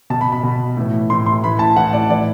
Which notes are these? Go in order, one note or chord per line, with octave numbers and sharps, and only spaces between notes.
B2 A5
B5
B5
B2
A2 E3
A2 E3 C6
C6
A2 E3 B5
A5
A2 E3 F#5
D5
A2 E3 D5